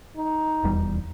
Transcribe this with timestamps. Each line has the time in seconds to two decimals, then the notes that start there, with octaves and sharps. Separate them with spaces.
0.17 D#4
0.63 D#1 E2 G3